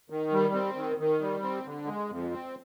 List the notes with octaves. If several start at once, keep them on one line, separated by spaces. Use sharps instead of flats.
D#3
G3
C4
D#3
D#3
G3
C4
D3
G#3
F2
C4